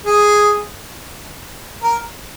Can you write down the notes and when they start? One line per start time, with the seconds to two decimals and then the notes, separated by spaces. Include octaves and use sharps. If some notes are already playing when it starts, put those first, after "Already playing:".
0.06 G#4
1.82 A#4